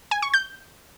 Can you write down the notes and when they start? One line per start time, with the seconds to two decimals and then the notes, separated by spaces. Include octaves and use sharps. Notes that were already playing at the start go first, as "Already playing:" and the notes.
0.11 G#5
0.22 C#6
0.34 G6